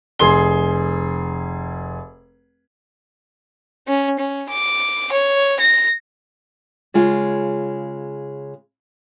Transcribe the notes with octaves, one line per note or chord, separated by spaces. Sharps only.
F1 G#4 C6 G7
C#4
C#4
D6
C#5
A#6
C#3 G#3 F4